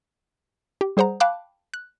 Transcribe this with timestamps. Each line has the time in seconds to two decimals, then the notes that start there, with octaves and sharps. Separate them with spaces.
0.81 G4
0.97 G3 G#4 C5 F#5 A#5
1.20 F5 G5 A5 B5 D6 F#6
1.74 F#6